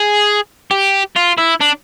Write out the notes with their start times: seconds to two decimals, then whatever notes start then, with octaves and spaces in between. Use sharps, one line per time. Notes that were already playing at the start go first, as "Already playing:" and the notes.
Already playing: G#4
0.71 G4
1.16 F4
1.38 E4
1.61 D4